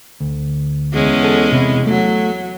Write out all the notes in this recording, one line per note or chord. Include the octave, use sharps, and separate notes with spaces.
D2
E2 G#3 C#4
A4
C3 E4
F#3 A3